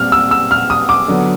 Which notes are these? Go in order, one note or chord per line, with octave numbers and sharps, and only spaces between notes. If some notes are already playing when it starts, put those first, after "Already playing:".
Already playing: A#2 G3 C4 F6
E6
E6
F6
D#6
D6
D3 F#3 B3